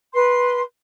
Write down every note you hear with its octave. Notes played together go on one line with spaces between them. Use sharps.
B4 C6